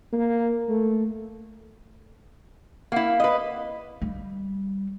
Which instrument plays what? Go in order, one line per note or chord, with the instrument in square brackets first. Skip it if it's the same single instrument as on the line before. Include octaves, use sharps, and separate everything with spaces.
[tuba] A#3
A3
[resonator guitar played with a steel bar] A#3 E4 [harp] F5 F#5
[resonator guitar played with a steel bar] B4 D#5
[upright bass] G3